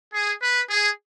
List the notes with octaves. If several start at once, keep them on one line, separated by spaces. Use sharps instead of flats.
G#4
B4
G#4